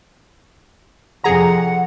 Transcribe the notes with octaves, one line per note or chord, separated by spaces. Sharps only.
F2 C3 G#4 F#5 A#5